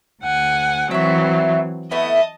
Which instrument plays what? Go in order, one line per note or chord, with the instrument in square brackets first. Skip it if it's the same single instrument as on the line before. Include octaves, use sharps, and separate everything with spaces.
[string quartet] D2 F#5 G#5
[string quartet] E3 F#3 C4 [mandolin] F#4 E5
[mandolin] A3 B3 E4 [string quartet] D#5 A5